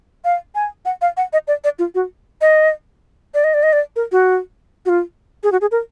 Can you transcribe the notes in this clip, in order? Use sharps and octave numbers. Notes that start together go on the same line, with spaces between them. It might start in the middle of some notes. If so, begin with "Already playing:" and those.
F5
G#5
F#5
F5
F#5
D#5
D5
D5
F4
F#4
D#5
D5
D#5
D5
D#5
D5
A#4
F#4
F#4
F4
G#4
F#4
G#4
A#4